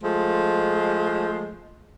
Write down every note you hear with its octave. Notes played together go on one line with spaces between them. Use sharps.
F3 G#3 A3